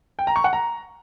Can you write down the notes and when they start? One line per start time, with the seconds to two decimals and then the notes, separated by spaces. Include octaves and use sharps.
0.19 G5
0.27 A#5
0.36 C#6
0.44 F#5
0.53 A#5